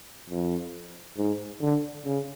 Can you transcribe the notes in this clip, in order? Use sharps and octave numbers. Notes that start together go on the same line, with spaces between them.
F2
G#2
D3
C#3